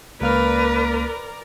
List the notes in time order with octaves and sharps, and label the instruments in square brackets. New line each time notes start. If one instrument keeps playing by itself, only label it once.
[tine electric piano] C#2 A#3 F6 [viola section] A#4 D5 A#5 [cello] B4